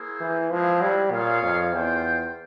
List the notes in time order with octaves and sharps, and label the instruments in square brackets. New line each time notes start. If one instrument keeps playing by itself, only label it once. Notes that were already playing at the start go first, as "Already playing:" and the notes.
Already playing: [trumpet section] A#3 E4 G#4 C5
[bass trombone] E3
[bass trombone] F3 [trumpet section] G#3 C4 E4
[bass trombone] G3
[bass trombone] A#2 [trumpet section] F4 G#4 C#5 F5
[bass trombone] F2
[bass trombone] E2 [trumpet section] F4 C5 G5